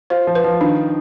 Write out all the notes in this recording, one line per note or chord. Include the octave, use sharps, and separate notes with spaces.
F4 C5
F3
B4
F3
D#3 D4